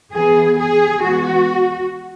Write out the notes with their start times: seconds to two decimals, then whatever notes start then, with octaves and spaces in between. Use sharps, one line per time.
0.14 E3 B3 G#4
0.58 G#4
1.03 E3 G#3 B3 F#4